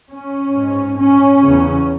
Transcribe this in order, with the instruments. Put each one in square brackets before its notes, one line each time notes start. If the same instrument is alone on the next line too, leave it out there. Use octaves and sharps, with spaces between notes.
[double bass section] C#4
G#2
C#4
E2 C#3